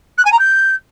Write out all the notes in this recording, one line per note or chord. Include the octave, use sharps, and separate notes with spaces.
F#6
G#5
A#5
G6